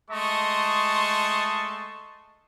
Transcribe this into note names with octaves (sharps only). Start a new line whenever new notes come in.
G#3 A3 D#5 A5 C6 C#6